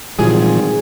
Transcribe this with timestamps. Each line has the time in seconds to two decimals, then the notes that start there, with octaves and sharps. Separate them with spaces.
0.19 G#1 A#2 D3 E3 F3 G3 F4 G#4